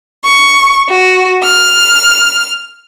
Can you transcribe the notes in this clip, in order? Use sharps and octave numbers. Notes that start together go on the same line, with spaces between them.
C#6
F#4
F6